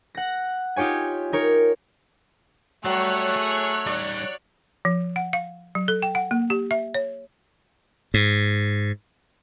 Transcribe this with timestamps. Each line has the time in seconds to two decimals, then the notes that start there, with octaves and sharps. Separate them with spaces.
0.15 F#5 A#6
0.76 D#4 F4 G4 C#5 G#5
1.32 D#4 A#4 C#5
2.85 F#3 G3 A3 G4 C#5 F#6
3.36 G#4
3.86 G3 D#4 D5
4.85 F3
5.16 F#5
5.33 F5
5.75 F#3
5.88 A4
6.02 G5
6.15 F#5
6.31 A#3
6.50 G4
6.71 E5
6.94 C#5
8.14 G#2